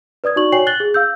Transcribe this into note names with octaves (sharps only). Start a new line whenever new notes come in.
B4 D5 D#6 G#6
D#4 F#4 D5 C#6 F#7
F#4 C#5 G5 G#5 C7 F#7
F#6 A6 F#7 G7
G#4
F5 E6 G6